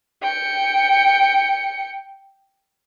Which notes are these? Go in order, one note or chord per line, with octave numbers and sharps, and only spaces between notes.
G5 C#7